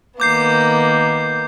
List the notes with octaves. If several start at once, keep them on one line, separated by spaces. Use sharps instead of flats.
D#3 A#3 B3 D6 G6 C7